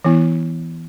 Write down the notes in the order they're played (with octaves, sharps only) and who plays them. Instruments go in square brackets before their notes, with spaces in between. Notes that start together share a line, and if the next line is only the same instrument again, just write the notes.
[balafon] E3 B3 E4